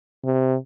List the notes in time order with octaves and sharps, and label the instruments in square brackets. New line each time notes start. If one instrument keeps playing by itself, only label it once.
[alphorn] C3